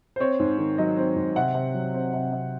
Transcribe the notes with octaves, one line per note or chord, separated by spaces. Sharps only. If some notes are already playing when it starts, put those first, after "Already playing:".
C5
C4 C#5
G#2
D#3
F#3 D#5
C4
G#2
C3 F#5
C3
F#3
C4
C3
C3